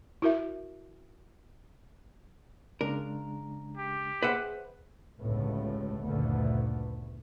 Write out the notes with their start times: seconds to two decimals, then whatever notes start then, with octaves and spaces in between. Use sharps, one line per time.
0.22 E4 F#4 A#4 E5
2.81 C#3 G#3 D4 A#4
3.77 G4
4.23 G#4 B4 C5 E5 F#5
5.21 G1 C#2 A2 C#3 A3 B3
6.05 F#1 D2 A#2 D3 A3 B3